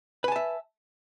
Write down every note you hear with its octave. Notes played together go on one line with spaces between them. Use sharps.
B4 E5 G#5 A5